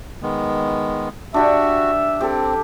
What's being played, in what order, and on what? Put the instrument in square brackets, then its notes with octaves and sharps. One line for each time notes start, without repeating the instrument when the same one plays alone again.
[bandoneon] D#3 G#3 B3
[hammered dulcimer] D4 G4 F#5 [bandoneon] F#4 [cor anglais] E5
[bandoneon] C4 [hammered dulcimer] G4 A4